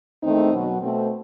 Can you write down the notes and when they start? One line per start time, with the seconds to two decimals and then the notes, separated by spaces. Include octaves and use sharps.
0.23 E2 D#3 A3 C4 D#4
0.51 B2 F#3 B3
0.80 B2 A3 C4